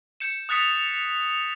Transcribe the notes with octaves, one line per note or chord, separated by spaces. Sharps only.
G6 C#7 E7
D#6 F#6 A6 B6 C#7 F7